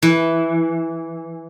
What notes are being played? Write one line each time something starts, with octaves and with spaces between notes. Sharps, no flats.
E3